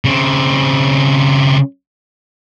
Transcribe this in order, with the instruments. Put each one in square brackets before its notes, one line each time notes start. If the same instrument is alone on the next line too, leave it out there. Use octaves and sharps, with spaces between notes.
[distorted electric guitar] C#3 C4